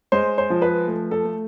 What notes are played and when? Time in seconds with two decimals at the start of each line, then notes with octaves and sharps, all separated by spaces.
0.12 G#3 C5
0.38 C5
0.50 F3
0.62 B4
0.87 A3
1.11 A4
1.25 A3